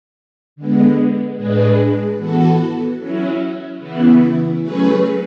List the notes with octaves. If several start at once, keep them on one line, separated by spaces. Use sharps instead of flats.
D3 G#3 B3
A2 G#3 D4 G#4 B4
E3 B3 F#4 A4
F#3 C#4 E4
C#3 E3 B3 E4
F#3 A3 C#4 G#4 B4